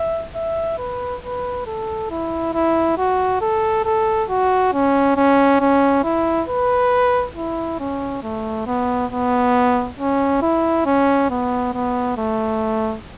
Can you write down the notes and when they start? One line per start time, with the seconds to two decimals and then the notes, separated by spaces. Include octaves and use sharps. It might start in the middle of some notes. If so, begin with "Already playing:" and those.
Already playing: E5
0.35 E5
0.78 B4
1.23 B4
1.66 A4
2.10 E4
2.54 E4
2.98 F#4
3.41 A4
3.85 A4
4.29 F#4
4.73 C#4
5.16 C#4
5.60 C#4
6.04 E4
6.48 B4
7.35 E4
7.80 C#4
8.23 A3
8.66 B3
9.11 B3
9.99 C#4
10.42 E4
10.86 C#4
11.30 B3
11.73 B3
12.17 A3